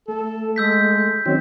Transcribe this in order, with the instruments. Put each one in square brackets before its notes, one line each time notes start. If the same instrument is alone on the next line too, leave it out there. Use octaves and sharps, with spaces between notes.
[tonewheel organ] A3 [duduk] A4
[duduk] G#3 [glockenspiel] E6 G6 B6
[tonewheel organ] D#3 F#3 C#4 [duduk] C4